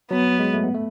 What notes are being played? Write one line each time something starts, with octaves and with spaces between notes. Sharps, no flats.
F#3 B3
G#3
A3
B3
A3